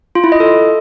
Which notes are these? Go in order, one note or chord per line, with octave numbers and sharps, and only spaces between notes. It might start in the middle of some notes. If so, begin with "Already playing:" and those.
F4
E4
D#5
A4